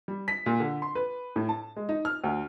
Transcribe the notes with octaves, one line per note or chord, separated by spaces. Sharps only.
G3
B6
A#2
D3
C6
B4
A2
A5
G#3
D#4
F6
D2